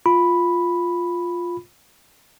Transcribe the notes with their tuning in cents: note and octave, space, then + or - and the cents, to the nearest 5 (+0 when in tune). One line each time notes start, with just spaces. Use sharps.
F4 +5 B5 +0